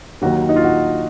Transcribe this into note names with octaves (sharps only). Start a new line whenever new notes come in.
D#2 D#3 F#3 F#4
D#4
F4
F#4